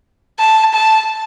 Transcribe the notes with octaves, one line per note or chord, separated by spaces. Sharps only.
A5
A5